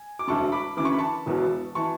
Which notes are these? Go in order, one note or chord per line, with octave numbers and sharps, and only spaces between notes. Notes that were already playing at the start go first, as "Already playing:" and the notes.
Already playing: G#5
D6
E1 D2 D3 A5 C#6
B5 D6
D2 C#3 E3 D6
C#6
B5
A5 C#6
E1 E2 B2
E3 A5 C#6